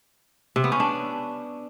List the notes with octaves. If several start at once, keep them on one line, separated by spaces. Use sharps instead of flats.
C3
B3
C#4
D4